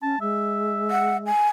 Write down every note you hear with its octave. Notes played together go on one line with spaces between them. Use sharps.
C#4 A5
G#3 E5
F#5
G#5